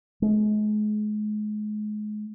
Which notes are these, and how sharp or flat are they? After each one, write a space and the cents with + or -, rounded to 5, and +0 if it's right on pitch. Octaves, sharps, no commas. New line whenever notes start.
G#3 +35